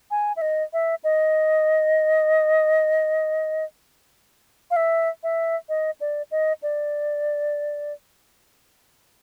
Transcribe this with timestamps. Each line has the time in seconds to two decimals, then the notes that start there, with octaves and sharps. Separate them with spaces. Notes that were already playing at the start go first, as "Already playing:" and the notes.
0.11 G#5
0.36 E5
0.41 D#5
0.73 E5
1.04 D#5
4.71 F5
4.76 E5
5.23 E5
5.69 D#5
6.01 D5
6.31 D#5
6.63 D5